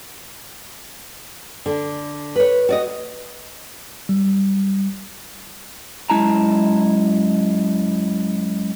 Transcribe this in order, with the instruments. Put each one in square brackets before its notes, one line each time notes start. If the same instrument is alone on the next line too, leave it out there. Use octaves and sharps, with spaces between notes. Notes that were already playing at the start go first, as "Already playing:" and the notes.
[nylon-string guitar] D3
B4 C#5
F#4 D5 D#5
[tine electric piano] G3
[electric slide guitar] F#2 G#3 E4 A5 A#5